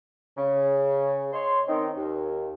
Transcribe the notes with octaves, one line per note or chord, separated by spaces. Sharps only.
C#3
C#5 D#5 C6
D#3 C4 C#4 D#4
D#2